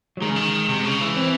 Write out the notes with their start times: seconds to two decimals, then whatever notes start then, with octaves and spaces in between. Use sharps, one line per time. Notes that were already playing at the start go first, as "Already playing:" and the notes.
0.17 F#3
0.21 D#3 G#3
0.29 C#3
0.36 D#3
0.69 C3
0.84 C#3
1.01 E3
1.17 C4